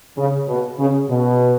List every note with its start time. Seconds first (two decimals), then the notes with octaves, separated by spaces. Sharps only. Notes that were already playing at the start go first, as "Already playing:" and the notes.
0.18 C#3
0.48 B2
0.79 C#3
1.10 B2